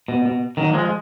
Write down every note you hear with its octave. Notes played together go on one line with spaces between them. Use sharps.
B2
B2
D#3 F#3
A#3
F3 G#3
G#3